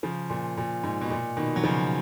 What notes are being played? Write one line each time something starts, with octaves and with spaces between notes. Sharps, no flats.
C#3 F3
A#2
A#2
G#2
B2
A#2
B2 D#3
F#3
C#3 F3